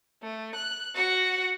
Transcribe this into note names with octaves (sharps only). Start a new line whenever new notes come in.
A3
F#6
F#4 F#5